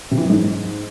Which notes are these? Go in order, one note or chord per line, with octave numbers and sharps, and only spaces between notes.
C3
E3
F#2
G#2